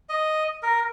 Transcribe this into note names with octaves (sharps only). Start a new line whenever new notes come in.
D#5
A#4